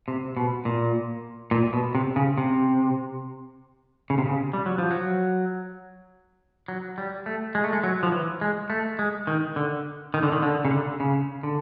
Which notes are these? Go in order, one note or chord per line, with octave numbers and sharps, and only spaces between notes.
C3
B2
A#2
A#2
B2
C3
C#3
C3
C#3
C3
C#3
G3
F#3
F3
F#3
F#3
G3
A3
G#3
A3
G#3
F#3
F3
E3
G#3
A3
G#3
D#3
D3
D#3
D3
D#3
D3
C#3
D3
C#3
D3